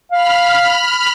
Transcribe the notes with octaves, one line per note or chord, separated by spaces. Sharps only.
F5 B5 F6